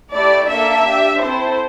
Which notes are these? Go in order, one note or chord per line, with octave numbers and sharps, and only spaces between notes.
A3 E4 G4 D5
A#3 D4 A4 E5
D4 G4
C4 E4 A4 C5